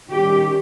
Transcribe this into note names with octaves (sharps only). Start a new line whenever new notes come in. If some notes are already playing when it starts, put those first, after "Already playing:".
D#3 G3 C#4 G4